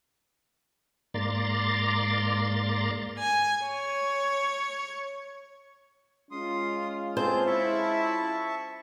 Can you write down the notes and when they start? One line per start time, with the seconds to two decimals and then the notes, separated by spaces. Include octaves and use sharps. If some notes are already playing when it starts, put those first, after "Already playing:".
1.14 G#2 A#3 D5 A#5 C6 A6
3.19 G#5
3.66 C#5
6.31 G#3 C#4 F4 C6 D#6
7.17 C4 G#4 C5 A5 G6
7.47 E4 E5 A5 C#6